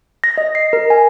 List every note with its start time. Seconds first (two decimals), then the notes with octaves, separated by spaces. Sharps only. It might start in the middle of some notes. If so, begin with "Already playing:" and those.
0.24 A#6
0.38 D#5
0.55 C7
0.73 A#4
0.90 G#5